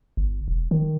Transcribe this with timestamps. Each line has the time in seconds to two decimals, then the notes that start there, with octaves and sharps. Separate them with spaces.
0.17 G1
0.48 E1
0.71 D#3